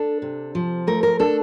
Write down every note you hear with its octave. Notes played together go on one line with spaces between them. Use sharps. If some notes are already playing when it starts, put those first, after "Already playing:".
Already playing: D4 A4
C3
F3
A3 A#4
A#4
D4 A4